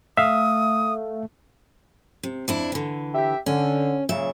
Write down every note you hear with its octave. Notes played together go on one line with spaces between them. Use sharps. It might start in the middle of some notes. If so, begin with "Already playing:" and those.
A3 E5 F5 D#6
C3
F2 D4 E4
D3 E3
G4 E5
D3 C#4
A#2 C#3 F#3 E5